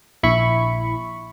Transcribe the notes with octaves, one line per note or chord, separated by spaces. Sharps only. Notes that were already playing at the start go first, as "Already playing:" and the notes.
A#1 E4 B5 C#6